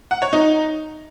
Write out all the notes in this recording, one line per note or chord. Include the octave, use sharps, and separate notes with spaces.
F#5
C#5
D#4